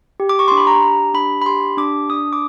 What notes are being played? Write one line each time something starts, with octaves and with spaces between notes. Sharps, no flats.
G4
D6
C#6
D4 C6
B5
A#5
G4
D4 B5
B5
G4 C6
D4 D6
D4 D#6
D6